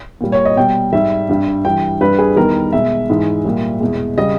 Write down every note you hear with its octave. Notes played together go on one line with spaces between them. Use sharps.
A#2 G3
C#5
D#5
B2 G3 G5
G#2 G3 E5
G2 G3
G2 E3 G3 G5
G2 G3 B4
G#4
E2 D#3 G3 A#4
B2 G#3 E5
G#2 E3 G#3
A#2 G3
E2 B2 G#3
C#3 G3 D#5